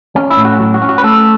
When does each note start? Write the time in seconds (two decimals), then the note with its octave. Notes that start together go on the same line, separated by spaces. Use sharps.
0.16 C#4
0.30 E4
0.37 A2
0.45 F#4
0.60 F#3
0.74 F#4
0.82 C#4
0.89 F#4
0.98 B4
1.04 A3 A4